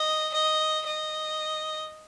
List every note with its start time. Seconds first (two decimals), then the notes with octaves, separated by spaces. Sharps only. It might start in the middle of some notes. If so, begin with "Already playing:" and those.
Already playing: D#5
0.34 D#5
0.87 D#5